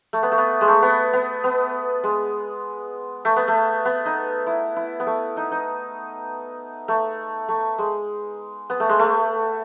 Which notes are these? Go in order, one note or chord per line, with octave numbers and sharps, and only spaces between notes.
A3
B3
A3
B3
G#3
A3
B3
B3
B3
G#3
A3
B3
A3
B3
D#4
E4
E4
B3
A3
D#4
D#4
A3
A3
G#3
B3
A3
G#3
A3